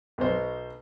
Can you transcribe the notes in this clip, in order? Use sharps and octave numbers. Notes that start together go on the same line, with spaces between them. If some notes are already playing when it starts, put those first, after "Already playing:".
B1 B2 C5